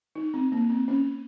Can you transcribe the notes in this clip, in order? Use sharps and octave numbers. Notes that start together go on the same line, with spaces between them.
D#4
C4
A#3
C4
C#4